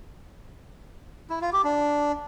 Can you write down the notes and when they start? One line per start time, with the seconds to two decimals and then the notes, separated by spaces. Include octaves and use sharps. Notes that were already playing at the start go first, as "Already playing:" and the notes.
1.30 E4
1.41 F4
1.53 G4
1.64 D4